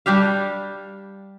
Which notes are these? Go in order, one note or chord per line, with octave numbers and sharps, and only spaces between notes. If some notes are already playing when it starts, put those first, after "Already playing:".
G3 D4 G4 F5